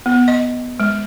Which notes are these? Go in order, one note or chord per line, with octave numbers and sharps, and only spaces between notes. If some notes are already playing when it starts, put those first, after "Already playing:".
B3
D#5
G#3